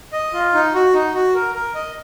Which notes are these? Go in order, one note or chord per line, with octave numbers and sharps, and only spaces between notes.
D#5
F4
D#4
F#4
D#4
F#4
A#4
A#4
D#5